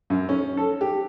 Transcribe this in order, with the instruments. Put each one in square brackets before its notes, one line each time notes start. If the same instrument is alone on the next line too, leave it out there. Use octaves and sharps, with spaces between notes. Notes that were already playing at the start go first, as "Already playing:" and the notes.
[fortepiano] F#2
C#4
A4
G4